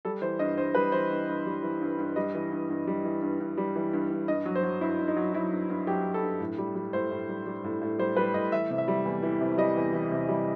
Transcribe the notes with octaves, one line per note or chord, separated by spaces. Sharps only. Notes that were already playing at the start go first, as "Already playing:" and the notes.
G3 A4
E3 C5
G2 D#5
G2 C5
G3 B4
E3 C5
G2
G2
G3
E3
G2
G2
G3 D#5
E3
G2
G2
G3
E3
G2
G2
G3
E3
G2
G2
G2 D#5
F#3
C5
F#3
G2 E4
G2
D#4
F#3
F#3 E4
G2
G2
F#3 G4
F#3
A4
G2
A2
G3
G3
A2 C5
A2
G3
G3
A2
A2
G3 C5
G3 B4
A2 D#5
E3 E5
C3
E5
G3
E2
E3
C3
G3 D#5
E2
E3
C3
G3